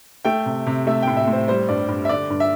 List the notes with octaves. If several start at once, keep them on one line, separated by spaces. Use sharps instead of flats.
A3 G5
C3
C3
A3 E5
A2 G5
E5
A2
C5
G3 C5
G2 D5
G2
E5
D3 D5
G2
E5